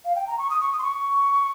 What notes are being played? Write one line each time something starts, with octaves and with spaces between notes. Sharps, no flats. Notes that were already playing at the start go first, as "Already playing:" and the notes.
F5
G5
A#5
C#6
D#6
C#6
D#6
C6
C#6